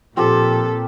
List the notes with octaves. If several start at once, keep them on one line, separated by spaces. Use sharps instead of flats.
A#2 F3 C4 G4 A4